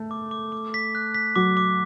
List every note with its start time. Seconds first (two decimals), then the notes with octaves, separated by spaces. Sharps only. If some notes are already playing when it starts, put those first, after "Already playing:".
Already playing: A3
0.11 D6
0.31 D6
0.52 D6
0.74 B6
0.95 F#6
1.14 B6
1.36 F#3 D6
1.57 D6